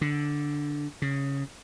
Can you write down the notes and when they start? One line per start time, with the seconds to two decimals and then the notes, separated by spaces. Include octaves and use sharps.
0.01 D3
1.02 C#3